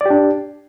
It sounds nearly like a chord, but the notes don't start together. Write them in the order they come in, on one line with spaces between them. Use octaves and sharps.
D5 G4 D4